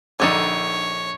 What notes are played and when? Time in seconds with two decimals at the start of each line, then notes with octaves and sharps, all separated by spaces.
0.20 A#1 D3 D#4 A4 C#5 G#5 D6